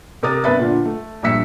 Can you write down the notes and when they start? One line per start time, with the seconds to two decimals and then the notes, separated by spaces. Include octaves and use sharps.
0.23 C3 A#4 A#5 D#6 A6
0.44 G1 B4 E5 A6
0.59 A#2 D3
0.85 A3
1.23 A#1 G2 E5 E6 B6 C#7